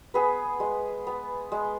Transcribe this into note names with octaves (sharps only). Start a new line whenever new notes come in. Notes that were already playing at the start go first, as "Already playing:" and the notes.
B3 G#4 B4
G#3
B3
G#3